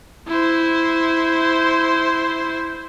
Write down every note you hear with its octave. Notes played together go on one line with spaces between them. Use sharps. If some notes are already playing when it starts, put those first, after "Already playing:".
E4 C5